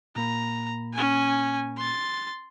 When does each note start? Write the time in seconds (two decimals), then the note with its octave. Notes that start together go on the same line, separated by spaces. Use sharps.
0.16 A#2 A#3 A#5 B5
0.94 C#4 G#5
1.78 C6 A6